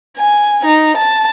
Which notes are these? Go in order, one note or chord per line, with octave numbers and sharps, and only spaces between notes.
G#5
D#4
A5